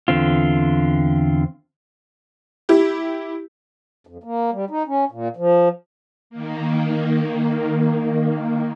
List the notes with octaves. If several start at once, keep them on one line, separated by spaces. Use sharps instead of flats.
E2 D3 C4 F4
E4 G4
F2
A#3
G3
D#4
C#4
A#2
F3
D#3 A#3